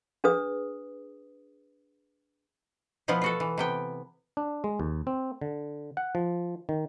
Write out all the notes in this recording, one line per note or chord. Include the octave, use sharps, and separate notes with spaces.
D4 G#4 B4 D#6
B2 F3 B3 E4 F4
F4 F#4 A4
E3
C3 B3 G5
D4
G#3
D#2
C4
D3
F#5
F3
D#3